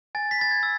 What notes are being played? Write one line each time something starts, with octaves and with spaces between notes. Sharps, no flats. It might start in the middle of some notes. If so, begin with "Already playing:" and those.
G#5 A6
B6
B5 A6
G#6
E6